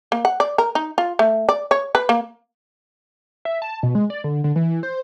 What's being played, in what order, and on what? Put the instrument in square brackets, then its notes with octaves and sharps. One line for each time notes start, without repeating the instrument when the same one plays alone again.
[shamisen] A#3
F#5
D5
A#4
D#4
F4
A3
D5
C#5
B4
A#3
[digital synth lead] E5
A5
B2
G#3
D5
D3
D3
E3
C5